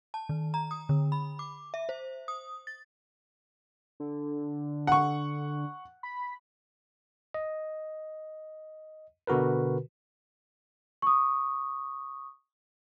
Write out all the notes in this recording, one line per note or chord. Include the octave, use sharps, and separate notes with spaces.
A5
D#3
A#5
D#6
D3
B5
D6
E5
C5
D#6
A6
D3
F#5 C#6
B5
D#5
B2 D3 F#4 A#4 B4
C#6 D#6